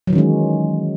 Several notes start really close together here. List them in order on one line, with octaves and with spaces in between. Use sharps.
F#3 E3 D#3 C#4 G#3